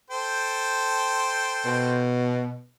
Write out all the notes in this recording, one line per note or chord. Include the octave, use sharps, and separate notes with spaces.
A4 C5 G5
B2